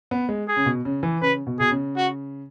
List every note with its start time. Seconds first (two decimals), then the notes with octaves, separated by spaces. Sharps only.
0.11 B3
0.29 G#3
0.48 G#4
0.57 C#3
0.66 B2
0.85 C#3
1.03 E3
1.22 C#3 B4
1.47 B2
1.59 B2 G#4
1.71 C#3
1.96 F#4